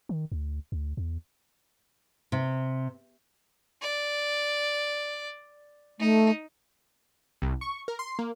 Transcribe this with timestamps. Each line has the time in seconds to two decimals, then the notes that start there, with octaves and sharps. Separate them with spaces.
0.09 D#3
0.32 D2
0.72 D2
0.97 E2
2.32 C3
3.82 D5
6.00 A3 D#4
7.42 C2
7.61 C#6
7.88 A#4
7.99 C6
8.19 A#3